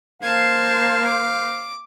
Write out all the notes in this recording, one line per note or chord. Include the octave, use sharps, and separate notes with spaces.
A#3 C5 F5 A5 G#6
D6